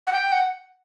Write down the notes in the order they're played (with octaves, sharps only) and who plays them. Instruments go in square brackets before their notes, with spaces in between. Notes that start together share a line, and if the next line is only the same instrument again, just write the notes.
[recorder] F#5
G5
F#5